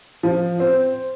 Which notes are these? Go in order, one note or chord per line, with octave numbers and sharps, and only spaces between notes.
F3
C4